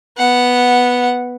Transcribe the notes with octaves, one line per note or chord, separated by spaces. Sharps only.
B3 F#5